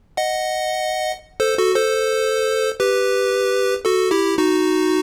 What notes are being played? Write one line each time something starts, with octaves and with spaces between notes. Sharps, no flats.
D#5 F#5
A4 C5
F#4 A4
A4 C5
G4 B4
F#4 A4
E4 G4
D#4 F#4